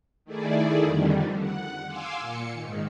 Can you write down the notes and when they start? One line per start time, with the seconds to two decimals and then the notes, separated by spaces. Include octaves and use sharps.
0.25 D#3 A3 E4 G#4 D5
0.80 F2 D3 D#3 G3
1.38 F#5
1.87 F5 G#5 C6 D6 E6
2.20 A#2 C#7
2.53 G#2 D#3